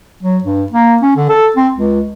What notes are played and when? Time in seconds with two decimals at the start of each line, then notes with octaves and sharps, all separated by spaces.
0.23 F#3
0.44 G2
0.72 A#3
1.02 C#4
1.16 D3
1.29 A4
1.56 C4
1.74 C#2